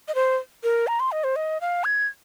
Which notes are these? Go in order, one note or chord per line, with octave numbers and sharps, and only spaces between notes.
D#5
C5
A#4
A#5
C6
D#5
C5
D#5
F5
G#6